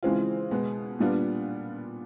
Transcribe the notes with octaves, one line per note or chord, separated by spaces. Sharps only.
C#3 E3 G#3 C4 F4
B2 G#3 B3
A#2 G3 B3 D4 F4